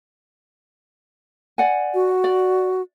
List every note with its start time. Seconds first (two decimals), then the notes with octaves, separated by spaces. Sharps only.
1.58 D5 F#5 G#5
1.94 F#4
2.24 D5